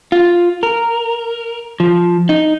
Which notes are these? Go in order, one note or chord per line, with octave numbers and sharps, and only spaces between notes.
F4
A#4
F3
D#4